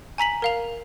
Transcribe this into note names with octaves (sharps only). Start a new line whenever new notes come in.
G#5 A#5 B6 F#7
A#4 F5 F7